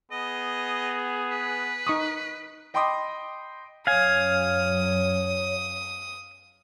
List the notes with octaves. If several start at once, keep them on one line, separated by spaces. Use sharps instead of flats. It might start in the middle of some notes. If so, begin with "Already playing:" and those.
B3 G#4 D#5
B4
D#4 C#6 D#6
D#5 G5 B5 C6 D6 D#6
F#2 F#3 C#5 F5 G#5 D#6